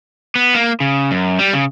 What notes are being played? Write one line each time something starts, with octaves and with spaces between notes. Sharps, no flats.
B3
A#3
C#3
F#2
G3
C#3